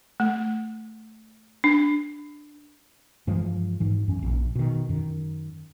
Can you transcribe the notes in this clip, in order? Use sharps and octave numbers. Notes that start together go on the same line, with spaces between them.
A3
D4
G2 E3 F3 G#3
G#2 E3
F#2 C#4
A#1
B2 D#3
F#2 D#3